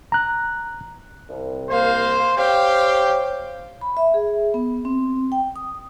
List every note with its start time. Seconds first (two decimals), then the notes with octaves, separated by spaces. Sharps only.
0.12 A#5 F#6
1.30 C2
1.70 A#3 C5 F5
2.38 G4 C5 C#5 F5 G5
3.81 B5
3.97 E5
4.14 G#4
4.54 B3
4.85 C4
5.32 G5
5.56 D#6